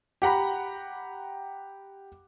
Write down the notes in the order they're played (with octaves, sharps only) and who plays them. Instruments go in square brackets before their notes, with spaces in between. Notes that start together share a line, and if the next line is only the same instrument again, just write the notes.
[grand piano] G4 F#5 A#5 B5